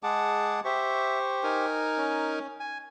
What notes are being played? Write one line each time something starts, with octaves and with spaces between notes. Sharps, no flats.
G#3 G#4 F#5 A5 D6
G4 C5 E5 C#6
D#4 A#4 G#5
C#4
G#5